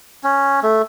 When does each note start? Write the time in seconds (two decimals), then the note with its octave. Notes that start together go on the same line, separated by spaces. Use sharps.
0.24 C#4
0.63 A3